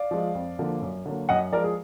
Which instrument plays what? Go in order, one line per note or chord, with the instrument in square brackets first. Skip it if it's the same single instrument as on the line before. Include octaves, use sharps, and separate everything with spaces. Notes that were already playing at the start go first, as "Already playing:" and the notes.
Already playing: [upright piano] D5 F5
F3 G#3
F2
D3 F3 A#3
F#2
D3 F#3 A#3
F#2 D#5 F#5
F3 G#3 A#4 D5
G#4